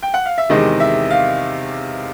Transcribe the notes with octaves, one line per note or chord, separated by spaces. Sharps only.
G5
F#5
F5
E5
E2 C3 D#3 G#3 D#5
E5
F5